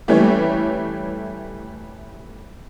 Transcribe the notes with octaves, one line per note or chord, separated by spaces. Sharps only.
E3 G3 A3 C#4 C#5